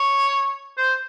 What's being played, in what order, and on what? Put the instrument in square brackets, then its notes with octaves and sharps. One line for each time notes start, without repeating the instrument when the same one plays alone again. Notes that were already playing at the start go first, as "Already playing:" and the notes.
Already playing: [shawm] C#5
C5